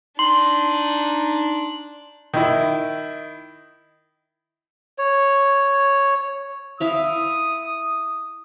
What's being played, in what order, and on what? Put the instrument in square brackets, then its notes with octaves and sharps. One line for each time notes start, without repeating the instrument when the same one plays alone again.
[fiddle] D4 [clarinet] D#4 [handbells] C6 [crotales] F#7
[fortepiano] D#3 E4
[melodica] C#5
[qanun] E4 E5 F5 [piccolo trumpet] D#6